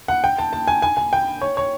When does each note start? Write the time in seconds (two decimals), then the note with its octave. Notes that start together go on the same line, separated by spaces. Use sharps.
0.08 F#5
0.24 G5
0.38 A5
0.53 A5
0.68 G#5
0.82 G#5
0.97 G#5
1.13 G5
1.42 C#5
1.57 C#5